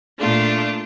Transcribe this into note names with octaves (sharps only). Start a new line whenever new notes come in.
A#2 A3 D4 F4